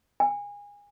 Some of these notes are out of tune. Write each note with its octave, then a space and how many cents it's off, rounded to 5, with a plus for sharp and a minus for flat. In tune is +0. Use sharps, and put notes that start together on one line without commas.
G#5 -25